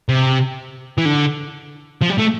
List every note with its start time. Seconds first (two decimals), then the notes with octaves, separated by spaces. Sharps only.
0.09 C3
0.98 E3
1.05 D3
2.01 F3
2.09 G3
2.18 A3